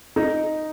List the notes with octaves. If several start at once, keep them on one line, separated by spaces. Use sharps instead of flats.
D#4